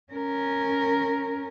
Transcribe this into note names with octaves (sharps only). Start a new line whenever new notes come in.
C#4 A#4